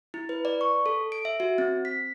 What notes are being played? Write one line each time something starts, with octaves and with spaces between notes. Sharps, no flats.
E4
B4
D5
C#6
A4
D7
E5
F#4
C4
B6